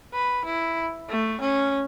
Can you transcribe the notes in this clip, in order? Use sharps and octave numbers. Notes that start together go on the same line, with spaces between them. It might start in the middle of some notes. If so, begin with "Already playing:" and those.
B4
E4
A3
C#4